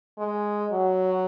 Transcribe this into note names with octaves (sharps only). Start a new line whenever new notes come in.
G#3
F#3